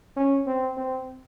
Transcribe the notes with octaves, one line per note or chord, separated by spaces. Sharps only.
C#4
C4
C4